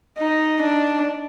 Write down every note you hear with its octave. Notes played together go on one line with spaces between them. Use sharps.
D#4
D4